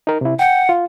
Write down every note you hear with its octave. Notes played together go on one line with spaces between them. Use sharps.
D#4 A#4
C3 E4
F#5 G5 G6
F4